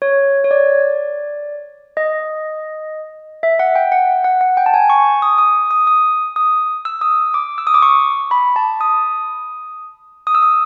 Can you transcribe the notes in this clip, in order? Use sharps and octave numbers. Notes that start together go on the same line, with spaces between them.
C#5
C#5
D5
D#5
E5
F#5
G5
F#5
F#5
F#5
G5
A5
G#5
C#6
D#6
D#6
D#6
D#6
D#6
E6
D#6
D6
E6
D#6
D6
C#6
B5
A5
D#6
D#6
E6
D#6